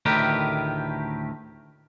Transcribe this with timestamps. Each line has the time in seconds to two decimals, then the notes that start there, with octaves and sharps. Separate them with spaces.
0.06 D2 A2 D#3 G4 A#4 B4